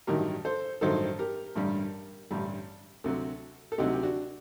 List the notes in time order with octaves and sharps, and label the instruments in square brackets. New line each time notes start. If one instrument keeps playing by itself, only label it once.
[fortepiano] A1 G2 D#3 F#3 G4 A#4
A4 C5
A1 G2 D#3 F#3 A4 C5
G4 A#4
A1 G2 D3 G3
A1 G2 D3 G3
D2 C3 F#3 F#4 A4
A4
D2 C3 F#3 D#4 G4
G4
D4 F#4